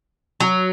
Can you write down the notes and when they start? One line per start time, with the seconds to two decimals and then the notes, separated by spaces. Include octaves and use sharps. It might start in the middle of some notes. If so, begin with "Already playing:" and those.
0.40 F#3